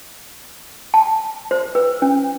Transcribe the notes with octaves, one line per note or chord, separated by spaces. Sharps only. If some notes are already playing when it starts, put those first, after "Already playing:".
A5
C5
B4
C#4